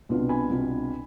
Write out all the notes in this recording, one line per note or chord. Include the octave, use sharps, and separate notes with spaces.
C2 B2 B3 D4 F4
G#5 B5
C2 B2 B3 D4 F4